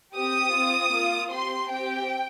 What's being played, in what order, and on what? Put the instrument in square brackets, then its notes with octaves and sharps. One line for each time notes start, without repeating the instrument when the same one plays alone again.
[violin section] C4 G4 D#6
C4 F4
A#3 F4
C4 G4 C6
C4 G4 G5